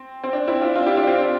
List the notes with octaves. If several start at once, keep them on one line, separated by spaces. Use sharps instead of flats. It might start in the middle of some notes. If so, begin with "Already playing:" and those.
Already playing: C4
C4
D4
C4 E4
D4 F4
D4 F4
E4 G4
D4 F4
C4
D4